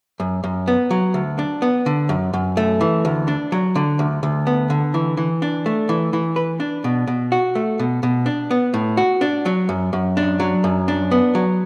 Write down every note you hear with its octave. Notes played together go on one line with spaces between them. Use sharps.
F#2
F#2
B3
F#3
D2
D4
B3
D3
F#2
F#2
A3
E3
D2
D4
F#3
D3
D2
D2
B3
D3
E3
E3
D4
A3
E3
E3
B4
D4
B2
B2
F#4
A3
B2
B2
D4
B3
A2
F#4
D4
F#3
F#2
F#2
D4
F#3
F#2
D4
B3
F#3